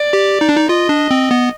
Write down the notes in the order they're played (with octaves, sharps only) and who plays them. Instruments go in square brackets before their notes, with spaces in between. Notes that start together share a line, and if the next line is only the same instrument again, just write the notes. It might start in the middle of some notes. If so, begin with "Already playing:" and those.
Already playing: [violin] D5
[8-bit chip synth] G4
D#4
D4
D#4
[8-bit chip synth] F4 [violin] D#5
[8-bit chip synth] D4
C4
B3